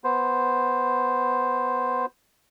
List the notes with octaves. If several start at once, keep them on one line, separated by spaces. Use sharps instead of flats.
B3 C5